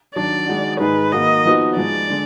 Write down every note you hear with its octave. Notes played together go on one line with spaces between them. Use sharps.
D#3 F#3 D4 D5
D#3 G#3 D#4 F#4
G#2 D#3 G#3 D#4 G#4 B4
D#3 A#3 D#4 F#4 D#5
F3 B3 D#4 F#4
F3 G#3 D#4 D5
D3 G#3